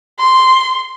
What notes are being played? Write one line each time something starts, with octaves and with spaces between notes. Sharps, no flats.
C6